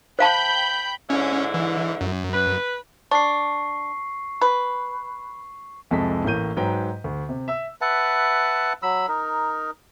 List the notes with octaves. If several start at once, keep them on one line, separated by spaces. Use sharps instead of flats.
C5 F5 G5 A5 B5 G6
G#2 D3 C#4 E4
E3
F#2
B4
D4 C#6 C7
B4
C2 F2 G#3 A4 A5 B6
A1 A2 A#3 G6 D#7
G#2 F#3 B4 G5 A#5
D2
C3
E5 E6
B4 E5 F#5 A5
F#3 B5 E6
D#4 A#4